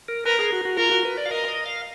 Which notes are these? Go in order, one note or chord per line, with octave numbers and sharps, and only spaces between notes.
A#4
A#4 B4
G#4
F#4
F#4
F4 A#4
F#4
B4
D5
F5
A#4 D#5
D#5
F5